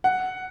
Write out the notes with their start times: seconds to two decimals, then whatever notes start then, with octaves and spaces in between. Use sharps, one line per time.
0.04 F#5